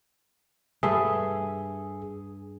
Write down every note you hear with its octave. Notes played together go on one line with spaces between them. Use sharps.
G2 G#4 A4 E5